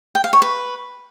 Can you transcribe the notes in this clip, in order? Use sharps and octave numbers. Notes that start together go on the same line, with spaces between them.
G5
F5
C#5
B4